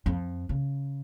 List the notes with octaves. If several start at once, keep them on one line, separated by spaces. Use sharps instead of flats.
F2
C#3